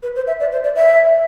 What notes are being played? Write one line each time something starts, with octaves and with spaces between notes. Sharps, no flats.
B4
C5
E5
D5
C5
D5
E5